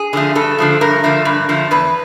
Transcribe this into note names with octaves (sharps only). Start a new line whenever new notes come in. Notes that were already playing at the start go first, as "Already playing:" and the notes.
Already playing: G#4
D3 F3 A3
G2 A4
D3 F3 A3
G2 A#4
D3 F3 A3
G2
D3 F3 A3
E2 B4